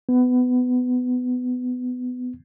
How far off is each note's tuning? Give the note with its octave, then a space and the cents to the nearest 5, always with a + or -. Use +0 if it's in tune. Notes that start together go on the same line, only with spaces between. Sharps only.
B3 +20